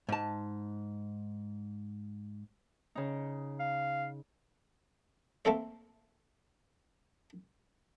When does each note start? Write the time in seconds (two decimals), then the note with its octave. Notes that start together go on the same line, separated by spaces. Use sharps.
0.09 G#2 A5
2.95 C#3 D#4
3.60 F5
5.45 A3 A#3 C4 A4 C5